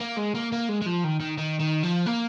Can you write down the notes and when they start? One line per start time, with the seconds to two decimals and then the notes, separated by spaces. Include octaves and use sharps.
0.01 A#3
0.18 G#3
0.35 A#3
0.52 A#3
0.69 G#3
0.82 G#3
0.86 F3
1.04 D#3
1.20 D#3
1.38 D#3
1.60 D#3
1.83 F3
2.06 A#3